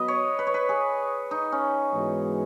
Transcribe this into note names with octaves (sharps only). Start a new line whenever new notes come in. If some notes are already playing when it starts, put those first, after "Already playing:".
Already playing: F#3 B3 F#4 B4 D#5
C#5
B4
C#5
B4
G#4
D#4
C#4
G#2 E3 G#3 B3 F#4